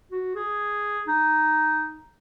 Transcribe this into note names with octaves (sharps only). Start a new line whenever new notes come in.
F#4
G#4
D#4